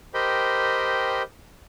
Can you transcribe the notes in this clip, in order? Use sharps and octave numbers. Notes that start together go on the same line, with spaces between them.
G4 A#4 C5 D#5 G5 B5